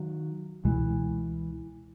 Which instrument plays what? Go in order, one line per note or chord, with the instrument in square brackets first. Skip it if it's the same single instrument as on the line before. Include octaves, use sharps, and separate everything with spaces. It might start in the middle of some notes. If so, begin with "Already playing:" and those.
Already playing: [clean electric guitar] D#3 F#3
[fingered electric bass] C#2 B2 G#3 [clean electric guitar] E3